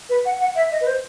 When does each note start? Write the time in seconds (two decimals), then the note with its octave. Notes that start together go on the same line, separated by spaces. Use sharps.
0.09 B4
0.25 F#5
0.39 F#5
0.55 E5
0.71 D#5
0.81 B4
0.86 C5